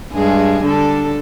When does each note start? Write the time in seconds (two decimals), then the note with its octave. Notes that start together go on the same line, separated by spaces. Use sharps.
0.13 G2 G#3 G#4
0.63 D3 G3 A4